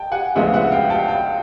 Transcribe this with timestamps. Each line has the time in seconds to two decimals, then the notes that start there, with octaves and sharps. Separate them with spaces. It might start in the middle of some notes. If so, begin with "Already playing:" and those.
Already playing: G5 A5
0.12 F#5 G#5
0.35 D2 C#3 F3 G#3 B3 E5 F#5
0.54 E5 F#5
0.72 F5 G5
0.90 G5 A5
1.08 G5 A5